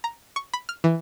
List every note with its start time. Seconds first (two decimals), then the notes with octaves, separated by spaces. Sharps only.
0.04 A#5
0.36 C#6
0.54 B5
0.69 F6
0.84 E3